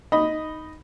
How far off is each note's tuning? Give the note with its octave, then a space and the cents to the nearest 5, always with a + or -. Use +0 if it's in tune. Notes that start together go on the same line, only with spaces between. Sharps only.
D#4 +0 D#5 +0 B5 +0